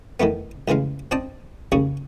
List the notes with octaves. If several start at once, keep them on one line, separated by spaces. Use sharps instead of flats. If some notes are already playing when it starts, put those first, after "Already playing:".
D#3 E3 A3 B3
A1 C#3 E3 G#3 F5
C4 D4 D#5 G5 A5
D#2 C#3 G#4 C#6